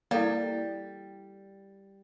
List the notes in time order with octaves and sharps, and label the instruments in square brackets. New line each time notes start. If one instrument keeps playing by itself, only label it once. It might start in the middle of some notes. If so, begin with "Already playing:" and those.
[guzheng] G3 [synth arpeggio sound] A#3 [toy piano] E4 A4 D5